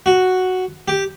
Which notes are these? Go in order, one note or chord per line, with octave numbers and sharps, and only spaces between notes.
F#4
G4